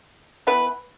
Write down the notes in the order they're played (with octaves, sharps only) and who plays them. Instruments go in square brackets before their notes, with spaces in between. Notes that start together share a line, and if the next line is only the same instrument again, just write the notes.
[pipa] E3 B3 E4 B4